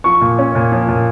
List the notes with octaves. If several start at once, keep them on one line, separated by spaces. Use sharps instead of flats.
F3 C#6
A#2
C#4
A#2
F3
A#2